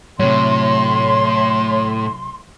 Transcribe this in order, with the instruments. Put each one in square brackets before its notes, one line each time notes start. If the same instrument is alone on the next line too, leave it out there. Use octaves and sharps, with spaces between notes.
[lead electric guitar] A2 [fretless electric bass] C3 F#3 [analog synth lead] C#5 [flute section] C6